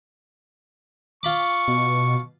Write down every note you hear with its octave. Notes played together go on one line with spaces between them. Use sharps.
F4 B5 C#6 D6
B2